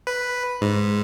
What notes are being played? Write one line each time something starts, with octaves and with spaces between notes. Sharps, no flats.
B4
G#2